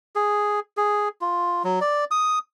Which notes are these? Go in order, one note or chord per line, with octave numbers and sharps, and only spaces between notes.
G#4
G#4
F4
F#3
D5
D#6